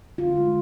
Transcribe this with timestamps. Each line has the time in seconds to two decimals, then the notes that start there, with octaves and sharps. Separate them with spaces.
0.18 D3 F4
0.37 G#3